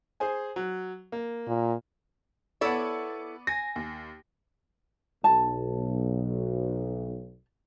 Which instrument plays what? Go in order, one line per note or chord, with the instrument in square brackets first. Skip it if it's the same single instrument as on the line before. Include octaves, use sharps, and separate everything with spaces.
[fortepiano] G#4 C5 G#5
F#3
A#3
[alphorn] A#2
[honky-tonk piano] B3 D5 [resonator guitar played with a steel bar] E4 A4 C#5
[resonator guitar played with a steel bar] G#5 [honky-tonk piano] A#6
[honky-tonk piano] D#2
[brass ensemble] B1 [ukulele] A5